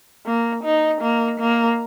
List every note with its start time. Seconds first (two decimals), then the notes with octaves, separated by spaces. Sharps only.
0.26 A#3
0.64 D#4
1.01 A#3
1.40 A#3